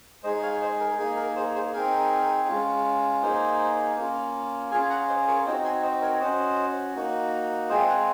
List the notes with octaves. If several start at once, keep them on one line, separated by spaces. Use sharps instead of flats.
G#3 D#4 G#4 C5 D#5
C#5 F5
C5 D#5
A#4
A#3 D#4 G#4
A#4
G#4 C5
G#4 C5
C4 D#4 G#4 A#4
G#3 C#4 F4
A#3 D#4 G#4 C5
A#3 C#4 F4
C#4 F4 G#4 F5 G#5
F#5 A#5
C5 D#5
A#4 C#5
C4 D#4 F#4 C5 D#5
G#5 C6
C5 D#5
A#4 C#5
C#4 F#4 C5 D#5
A#3 D#4 F#4
G#3 C4 F4 G#4 C5 D#5
F#5 A#5